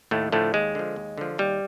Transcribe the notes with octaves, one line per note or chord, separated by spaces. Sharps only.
D#2 A2 A3
A2 D3 F3 A3
D#2 G#3
D3 F3
D#2
D3 F3
D#2 G3